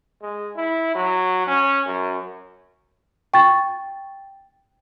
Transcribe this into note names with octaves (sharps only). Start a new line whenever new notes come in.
G#3
E4
F#3
C#4
F#2
G5 C#6 A6